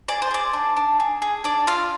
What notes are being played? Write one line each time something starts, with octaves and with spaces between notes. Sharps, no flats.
G#4 D5
C5
G#4 D5
D4
D4
G#4
G#4
D4 D5
F4 F5